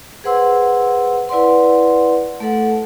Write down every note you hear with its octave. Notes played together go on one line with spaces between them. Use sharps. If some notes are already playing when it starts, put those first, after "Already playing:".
G#4 B4 C5 F#5 C6 E6
E4 B4 D5 F#5 C6
A3 A4 F#5